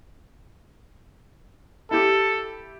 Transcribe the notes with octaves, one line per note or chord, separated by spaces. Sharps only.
E4 G4 A4